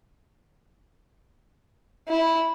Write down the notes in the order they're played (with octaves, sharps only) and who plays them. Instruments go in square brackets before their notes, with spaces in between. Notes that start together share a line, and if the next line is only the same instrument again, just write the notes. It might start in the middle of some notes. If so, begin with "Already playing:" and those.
[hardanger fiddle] E4